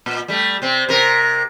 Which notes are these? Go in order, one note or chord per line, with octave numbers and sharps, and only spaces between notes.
A#2
G3 A3
C3 C4
C3 A#4